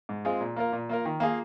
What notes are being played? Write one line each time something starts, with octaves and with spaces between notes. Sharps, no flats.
G#2
G#3 C4 F4 G#4
A#2
A#3 F4 A#4
A#2
A#3 F4 A#4
D#3
A#3 F4 G#4